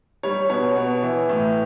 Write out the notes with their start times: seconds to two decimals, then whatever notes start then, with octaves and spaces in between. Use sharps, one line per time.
0.23 G3 C#5
0.50 B2 C#5
0.76 B2
1.03 E3
1.29 A2